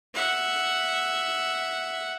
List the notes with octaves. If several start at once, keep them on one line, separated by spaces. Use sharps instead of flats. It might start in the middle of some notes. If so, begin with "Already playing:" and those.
E5 F#5